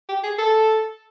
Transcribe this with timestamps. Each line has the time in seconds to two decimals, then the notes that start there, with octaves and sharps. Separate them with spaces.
0.09 G4
0.23 G#4
0.38 A4